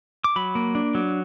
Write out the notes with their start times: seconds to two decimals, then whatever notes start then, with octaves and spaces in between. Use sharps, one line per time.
0.24 D6
0.36 F#3 B5
0.55 A#3
0.75 D4
0.95 F#3